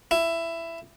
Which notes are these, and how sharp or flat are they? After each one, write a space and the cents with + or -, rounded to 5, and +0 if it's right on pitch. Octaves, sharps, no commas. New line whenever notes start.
E4 +15